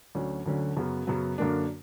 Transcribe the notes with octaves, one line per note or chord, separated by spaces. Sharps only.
D2 D3 F#3 C#4
D2 D3 F#3 C#4
F#2 C#3 F#3 B3
F#2 C#3 F#3 B3
F#2 D3 A#3 D4